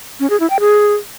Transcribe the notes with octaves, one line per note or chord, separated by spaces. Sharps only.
C#4
G#4
E4
G5
G#4